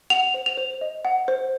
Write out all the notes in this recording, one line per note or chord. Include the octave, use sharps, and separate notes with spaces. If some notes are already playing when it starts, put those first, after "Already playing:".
F#5 F7
C5
F7
C5
D#5
F#5
C5